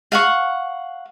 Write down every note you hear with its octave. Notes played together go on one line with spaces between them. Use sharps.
F5 F#5 C#6